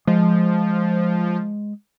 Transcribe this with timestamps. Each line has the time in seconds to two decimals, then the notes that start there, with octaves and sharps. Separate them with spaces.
0.07 F3 G#3